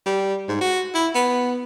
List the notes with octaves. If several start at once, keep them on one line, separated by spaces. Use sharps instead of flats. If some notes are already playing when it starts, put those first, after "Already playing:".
G3
G#2
F#4
E4
B3